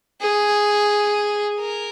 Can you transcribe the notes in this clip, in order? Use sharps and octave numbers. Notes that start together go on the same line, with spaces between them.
G#4
A#4